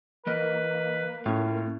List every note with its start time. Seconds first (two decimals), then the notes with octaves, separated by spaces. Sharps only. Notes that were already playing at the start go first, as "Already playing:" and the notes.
0.27 E3 A#3 A#4 B4 D#5
1.26 A2 C#4 F4